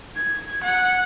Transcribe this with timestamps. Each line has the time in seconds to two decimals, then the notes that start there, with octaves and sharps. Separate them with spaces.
0.15 G#6
0.63 F#5